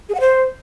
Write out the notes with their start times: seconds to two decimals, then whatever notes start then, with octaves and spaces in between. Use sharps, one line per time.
0.09 G#4
0.15 F#5
0.20 C5